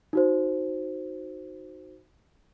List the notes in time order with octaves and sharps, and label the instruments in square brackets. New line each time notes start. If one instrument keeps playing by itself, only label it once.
[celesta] D#4 F#4 C5